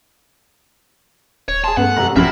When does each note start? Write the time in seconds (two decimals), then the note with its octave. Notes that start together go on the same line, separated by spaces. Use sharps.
1.48 D#1 C#5
1.64 G#4 A5 C6
1.77 G2 A3 B3 F#5
1.96 F1 F#2 A3 G4 A#5
2.16 A#1 C3 F3 F#3 G#3 E5 B5 F6